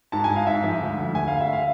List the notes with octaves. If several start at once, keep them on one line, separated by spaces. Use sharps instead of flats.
G#2 A5
G#5
G#2
F5
G#2 E5
F3
D2
D2
D2 G#5
D2 F5
E5
F5